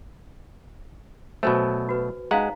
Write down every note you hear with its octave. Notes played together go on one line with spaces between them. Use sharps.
B2 F#3 A3 C5 G#5
F#4 B4
G#3 D#4 F5 F#5 A#5